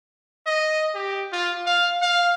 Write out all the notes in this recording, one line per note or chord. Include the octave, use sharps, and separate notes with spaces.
D#5
G4
F4
F5
F5